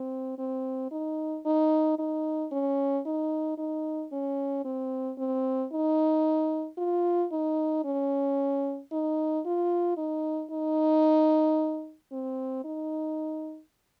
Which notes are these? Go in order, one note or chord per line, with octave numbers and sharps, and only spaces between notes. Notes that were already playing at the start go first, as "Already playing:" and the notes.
Already playing: C4
C4
D#4
D#4
D#4
C#4
D#4
D#4
C#4
C4
C4
D#4
F4
D#4
C#4
D#4
F4
D#4
D#4
C4
D#4